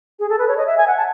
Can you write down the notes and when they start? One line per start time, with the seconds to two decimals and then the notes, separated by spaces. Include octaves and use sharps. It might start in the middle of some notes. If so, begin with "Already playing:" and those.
0.19 G#4
0.29 A4
0.39 B4
0.48 C#5
0.57 D#5
0.66 E5
0.77 G#5
0.87 F#5
0.97 A5